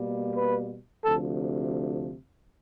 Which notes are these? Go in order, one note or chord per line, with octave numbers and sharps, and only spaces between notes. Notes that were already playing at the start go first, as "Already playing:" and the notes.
Already playing: B2 G3 A#3
B4
D2 C3 F3 A4